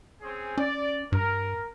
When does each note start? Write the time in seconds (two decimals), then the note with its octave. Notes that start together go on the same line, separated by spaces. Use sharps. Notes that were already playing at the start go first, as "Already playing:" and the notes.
0.21 C4 C#4 G#4
0.58 C#4 D5
1.12 G2 A#4